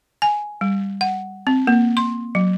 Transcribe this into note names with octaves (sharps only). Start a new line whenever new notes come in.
G#5
G3
F#5
C4
A#3
C6
F#3